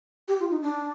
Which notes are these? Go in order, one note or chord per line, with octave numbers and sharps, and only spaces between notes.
G4
F4
D#4
D4